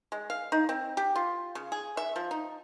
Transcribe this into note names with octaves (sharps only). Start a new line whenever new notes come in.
G#3
F5
D#4
C4
G4
F4
C#3
G#4
E5
F3
D#4